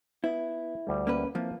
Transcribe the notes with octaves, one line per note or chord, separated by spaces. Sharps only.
B3 E4
D2 G3
A#3 C#4 B4
F3 A#3 C4 E4